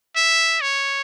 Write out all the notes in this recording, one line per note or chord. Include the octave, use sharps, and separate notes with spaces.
E5
C#5